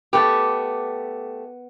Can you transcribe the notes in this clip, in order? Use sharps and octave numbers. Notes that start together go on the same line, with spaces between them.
A3 B3 G4 B4